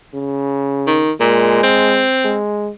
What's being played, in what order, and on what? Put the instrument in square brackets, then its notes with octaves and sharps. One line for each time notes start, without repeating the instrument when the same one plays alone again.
[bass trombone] C#3
[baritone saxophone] D#3
[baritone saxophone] A#2 [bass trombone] G#3
[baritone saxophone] C4
[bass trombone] G#3